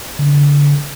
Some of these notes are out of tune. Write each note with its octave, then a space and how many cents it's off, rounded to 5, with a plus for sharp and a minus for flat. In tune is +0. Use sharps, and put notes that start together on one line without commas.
D3 -30